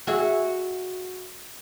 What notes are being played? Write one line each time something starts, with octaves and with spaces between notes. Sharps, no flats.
F#4 G#4 E5